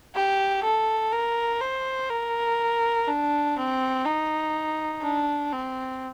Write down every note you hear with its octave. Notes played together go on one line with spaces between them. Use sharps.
G4
A4
A#4
C5
A#4
D4
C4
D#4
D4
C4